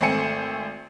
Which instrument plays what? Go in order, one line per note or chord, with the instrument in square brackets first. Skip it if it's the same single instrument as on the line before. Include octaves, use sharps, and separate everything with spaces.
[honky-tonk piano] G#1 A3 C4 G#5 C#7